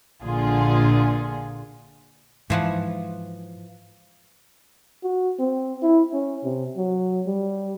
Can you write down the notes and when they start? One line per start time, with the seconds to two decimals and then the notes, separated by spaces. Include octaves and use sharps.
0.23 A#1 A#2 D3 F4 G#4
2.50 G#2 E3 F3 F#5
5.03 F#4
5.39 C4
5.82 E4
6.13 C#4
6.44 C3
6.76 F#3
7.26 G3